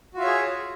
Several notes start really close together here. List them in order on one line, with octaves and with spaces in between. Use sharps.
F#4 F4 E5 C#5 G#4